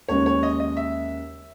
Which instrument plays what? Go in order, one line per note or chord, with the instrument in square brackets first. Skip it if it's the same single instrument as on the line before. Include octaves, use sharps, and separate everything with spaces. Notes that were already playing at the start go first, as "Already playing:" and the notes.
[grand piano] D#2 C#3 G#3 C#4 [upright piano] C#5
[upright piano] C#5
D#5
D#5
E5